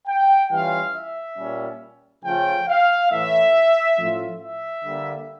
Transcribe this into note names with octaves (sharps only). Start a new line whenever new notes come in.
G5
E3 G3 C#4 F4 F5
E5
A#2 G3 C#4
C#3 F3 A3 C#4 F4 G5
F5
A2 E3 A3 E5
A2 F3 A3 C#4 F4
E5
D3 G3 A#3